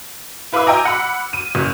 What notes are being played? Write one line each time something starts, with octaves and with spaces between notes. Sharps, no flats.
E4 B4 F5 B5 D6 E6
D#5 G5 G#5 A#5 D6
F#5 B5
D#7
F#1